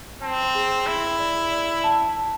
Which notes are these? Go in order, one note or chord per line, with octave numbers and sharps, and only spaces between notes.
C4 A5
G#4
E4 G#4
D5
D5
A5
A5